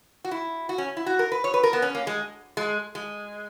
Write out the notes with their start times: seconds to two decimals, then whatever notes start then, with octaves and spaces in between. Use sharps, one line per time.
0.25 F#4
0.31 E4
0.69 F#4
0.78 C#4
0.97 E4
1.06 F#4
1.19 A#4
1.32 B4
1.44 C#5
1.54 B4
1.63 A#4
1.73 B3
1.82 C#4
1.95 A#3
2.07 G#3
2.57 G#3
2.95 G#3